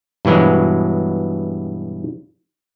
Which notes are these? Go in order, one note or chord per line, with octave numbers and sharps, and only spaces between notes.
G2 B2 E3 F#3 G#3